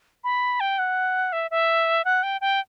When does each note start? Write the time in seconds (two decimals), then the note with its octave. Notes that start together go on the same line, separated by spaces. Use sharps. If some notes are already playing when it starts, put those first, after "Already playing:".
0.24 B5
0.60 G5
0.78 F#5
1.32 E5
1.51 E5
2.05 F#5
2.23 G5
2.41 G5